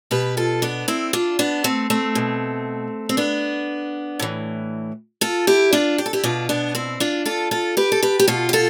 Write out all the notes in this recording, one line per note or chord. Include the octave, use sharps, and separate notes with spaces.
B2 G4 B4
F4 A4
B3 D4
C4 E4
D4 F4
B3 D4
A3 C4
A3 C4
B2
C4
B3 D4
A2 E3
F4 A4
E4 G4
D4 F4
G4
A4
E4 G4
B2 D4 F4
B3 D4
C4 E4
D4 F4
F4 A4
F4 A4
G4 B4
A4
G4 B4
G4
B2 F4 A4
G4
F4 A4